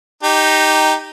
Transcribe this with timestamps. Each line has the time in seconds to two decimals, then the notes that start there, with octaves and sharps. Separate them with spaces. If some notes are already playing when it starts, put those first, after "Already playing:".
0.23 D#4 G4